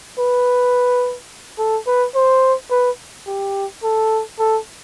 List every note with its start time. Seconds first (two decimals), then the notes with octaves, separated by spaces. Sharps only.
0.19 B4
1.58 A4
1.87 B4
2.15 C5
2.71 B4
3.27 G4
3.83 A4
4.39 A4